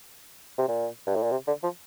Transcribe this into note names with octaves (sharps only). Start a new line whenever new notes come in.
C3
A#2
G2
A2
A#2
C3
D3
F3